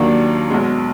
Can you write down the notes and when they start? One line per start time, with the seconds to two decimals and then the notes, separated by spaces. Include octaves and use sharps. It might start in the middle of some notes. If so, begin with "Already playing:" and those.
Already playing: D#2 D#3 F#3 A#3 D4
0.50 B1 B2 G#3